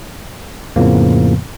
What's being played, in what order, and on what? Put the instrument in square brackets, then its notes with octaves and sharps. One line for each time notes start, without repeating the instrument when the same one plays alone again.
[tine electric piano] F2 A2 C#3 F3 A#3 B3